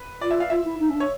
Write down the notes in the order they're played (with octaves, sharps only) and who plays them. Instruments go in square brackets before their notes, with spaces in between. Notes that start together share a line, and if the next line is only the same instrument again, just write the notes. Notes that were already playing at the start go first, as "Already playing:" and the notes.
Already playing: [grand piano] B4
[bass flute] F4 [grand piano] D5
[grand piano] E5
F5
[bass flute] F4 [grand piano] E5
[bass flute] E4
D#4
C#4
D4
[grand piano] C#5